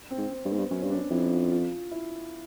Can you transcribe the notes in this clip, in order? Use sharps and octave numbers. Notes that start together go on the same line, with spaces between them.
C4
G#2
C4
G2
G#2 B3
G2
F#2 C#4
G2
D4
F#2
F2 E4
F4
F4
E4